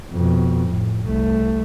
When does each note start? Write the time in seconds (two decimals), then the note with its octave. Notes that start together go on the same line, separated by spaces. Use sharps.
0.11 F2 B2
0.68 A2
1.05 C2 A3